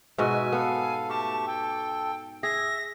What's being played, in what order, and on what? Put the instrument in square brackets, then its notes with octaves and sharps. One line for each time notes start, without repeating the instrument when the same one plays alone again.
[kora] G#2 B2 F#4 [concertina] E5 [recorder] G#5
[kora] B3 [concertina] A4 F5
[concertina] A3 G4 C#6 [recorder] A5
[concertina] A4 [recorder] G5
[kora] G#4 [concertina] E5 [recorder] A#6